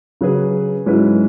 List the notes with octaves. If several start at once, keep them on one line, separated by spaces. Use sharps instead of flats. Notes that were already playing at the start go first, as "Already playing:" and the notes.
C#3 F#3 C#4 G#4 B4
G#2 F#3 C#4 E4 B4